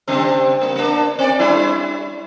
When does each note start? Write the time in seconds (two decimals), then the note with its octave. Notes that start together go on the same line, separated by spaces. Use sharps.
0.08 C#3 G3 C4
0.61 A#3
0.76 A#3 D4
1.19 C4 C#5 D5
1.39 G3 D4 E4